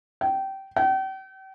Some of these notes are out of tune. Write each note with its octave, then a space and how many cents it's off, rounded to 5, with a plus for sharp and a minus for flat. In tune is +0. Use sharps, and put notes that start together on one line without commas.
G5 -20
G5 -40